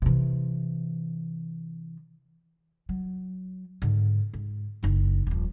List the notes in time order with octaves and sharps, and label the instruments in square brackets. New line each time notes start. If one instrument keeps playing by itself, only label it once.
[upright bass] C3 E3
F#3
G#2 D3
G#2
F#1 D#4
D#1 F3